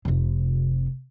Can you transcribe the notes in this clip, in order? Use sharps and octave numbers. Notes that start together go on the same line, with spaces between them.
F1 C3